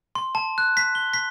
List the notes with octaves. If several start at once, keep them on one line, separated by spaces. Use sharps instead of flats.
C6
A5
F#6
B6
G7
B6